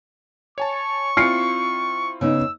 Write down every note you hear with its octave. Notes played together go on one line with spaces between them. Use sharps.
C#5 G#5 A5 C#6
C4 E4 F4 D5 F6 C7 C#7
C#3 B3 D#4 E6